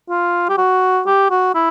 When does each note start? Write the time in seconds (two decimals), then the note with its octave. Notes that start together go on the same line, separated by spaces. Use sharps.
0.10 F4
0.49 G4
0.58 F#4
1.06 G4
1.30 F#4
1.54 E4